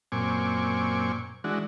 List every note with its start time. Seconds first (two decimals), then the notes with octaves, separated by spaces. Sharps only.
0.12 F#2 A#2 C4 G#5 C#6 D6
1.44 E3 G#3 D4 F#4